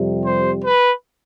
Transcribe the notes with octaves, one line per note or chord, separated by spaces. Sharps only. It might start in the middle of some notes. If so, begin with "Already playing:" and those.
Already playing: F2 C3 G3
C5
B4